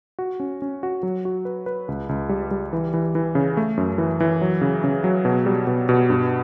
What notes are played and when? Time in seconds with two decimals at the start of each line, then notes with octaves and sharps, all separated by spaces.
0.19 F#4
0.40 C#4
0.62 C#4
0.83 F#4
1.03 F#3
1.25 F#4
1.45 B4
1.66 B4
1.88 C#2
2.09 C#2
2.29 G3
2.51 G3
2.73 E3
2.94 E3
3.15 E3
3.35 C#3
3.57 A3
3.77 F#2
3.98 E3
4.20 E3
4.42 F#3
4.61 C#3
4.84 C#3
5.04 F#3
5.25 B2
5.46 G3
5.67 B2
5.89 B2
6.10 G2